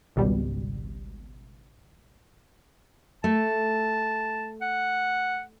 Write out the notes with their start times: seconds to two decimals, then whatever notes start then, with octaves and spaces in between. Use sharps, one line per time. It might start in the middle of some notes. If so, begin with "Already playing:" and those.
0.16 G#1 C#2 B2 G3
3.24 A3 A5
4.62 F#5